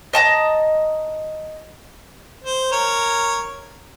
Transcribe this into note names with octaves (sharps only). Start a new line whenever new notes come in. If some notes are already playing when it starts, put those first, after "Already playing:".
D#5 A5 A#5
C5
A#4 C#5